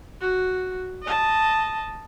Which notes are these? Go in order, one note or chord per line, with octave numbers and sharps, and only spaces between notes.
F#4
D#5 A5